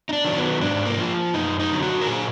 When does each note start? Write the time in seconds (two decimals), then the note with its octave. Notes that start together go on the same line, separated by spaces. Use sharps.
0.09 D#4
0.13 D4
0.25 D#3 F#3
0.37 B3
0.61 G#2 D4
0.86 A#3
0.98 F3
1.34 F#2 D#4
1.59 D#4
1.72 D3 F#3
1.83 F#4
2.01 A#4
2.07 A#2 G#4